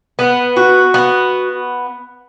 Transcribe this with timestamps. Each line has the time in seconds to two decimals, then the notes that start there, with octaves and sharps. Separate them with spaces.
0.19 B3
0.56 F#4
0.94 B3